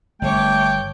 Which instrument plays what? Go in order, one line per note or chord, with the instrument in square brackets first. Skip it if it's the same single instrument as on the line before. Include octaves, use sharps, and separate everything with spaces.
[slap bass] G1 [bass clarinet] A3 [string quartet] C#5 D6 [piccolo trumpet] G5